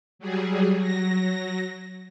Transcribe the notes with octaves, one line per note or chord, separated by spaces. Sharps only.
F#3 G3 G#4
F#3 A#6